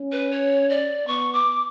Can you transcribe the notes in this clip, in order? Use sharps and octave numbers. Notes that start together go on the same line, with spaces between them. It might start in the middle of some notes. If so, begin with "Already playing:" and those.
Already playing: C#4
B4
C#5
D5
B3 C#6
D6